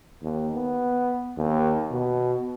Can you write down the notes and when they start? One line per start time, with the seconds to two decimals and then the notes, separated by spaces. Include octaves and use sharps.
0.22 D#2
0.55 B3
1.37 D#2
1.91 B2